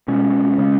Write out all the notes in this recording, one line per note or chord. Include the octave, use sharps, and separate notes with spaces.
B2 G#3 C#4
C#3 G#3 C#4